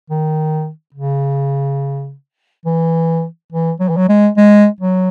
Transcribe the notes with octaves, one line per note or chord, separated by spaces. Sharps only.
D#3
C#3
E3
E3
F#3
E3
F#3
G#3
G#3
F#3